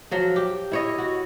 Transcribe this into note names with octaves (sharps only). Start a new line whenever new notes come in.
F3 F#3 F#5
G4
E4 C#5 D#5
F#4